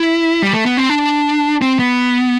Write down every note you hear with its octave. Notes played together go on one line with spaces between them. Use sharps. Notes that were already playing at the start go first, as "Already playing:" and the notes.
Already playing: E4
G3
A3
B3
C4
D4
C4
B3